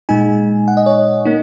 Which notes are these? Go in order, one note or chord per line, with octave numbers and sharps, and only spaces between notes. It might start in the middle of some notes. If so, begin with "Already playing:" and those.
A#2 G#3 D#4 G#5
F#5
D#5
C#5
A#3 D#4